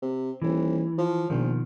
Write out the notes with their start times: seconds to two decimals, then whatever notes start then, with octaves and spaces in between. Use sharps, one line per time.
0.02 C3
0.42 D#1 E3
0.98 F3
1.30 A#1 B2 D#3 F3